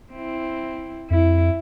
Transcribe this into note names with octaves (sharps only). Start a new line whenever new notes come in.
C4 E4
F2 E4